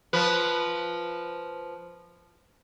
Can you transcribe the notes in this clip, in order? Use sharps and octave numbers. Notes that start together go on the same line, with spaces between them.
F3 B4